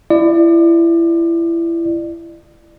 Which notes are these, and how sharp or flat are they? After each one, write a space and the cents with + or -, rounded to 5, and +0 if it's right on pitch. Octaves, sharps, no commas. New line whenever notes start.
E4 +25 D5 +30